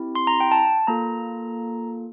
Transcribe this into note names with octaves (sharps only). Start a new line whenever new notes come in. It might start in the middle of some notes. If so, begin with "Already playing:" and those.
Already playing: C4 E4 G4
C6
A#5
G5
A5
A#3 F4 A4 A#5